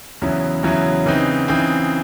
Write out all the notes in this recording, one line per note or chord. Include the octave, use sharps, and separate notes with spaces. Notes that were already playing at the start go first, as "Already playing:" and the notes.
E2 C#3 F#3 C#4 E4
E2 C#3 F#3 C#4 E4
C#3 E3 C4 D#4
C#3 E3 C4 D#4